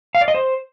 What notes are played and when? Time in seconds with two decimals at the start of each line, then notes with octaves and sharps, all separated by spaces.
0.15 F5
0.21 D5
0.28 D#5
0.35 C5